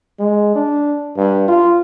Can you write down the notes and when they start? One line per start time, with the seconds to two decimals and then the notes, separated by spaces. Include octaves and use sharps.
0.19 G#3
0.55 D4
1.17 G2
1.48 F4